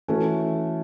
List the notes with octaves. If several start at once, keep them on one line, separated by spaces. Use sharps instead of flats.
E3 A3 C#4 F#4 A4